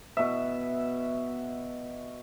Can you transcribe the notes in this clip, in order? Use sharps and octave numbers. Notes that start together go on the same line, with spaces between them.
B2 E5